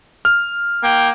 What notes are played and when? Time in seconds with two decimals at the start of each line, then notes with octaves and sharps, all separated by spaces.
0.25 F6
0.83 A#3 G5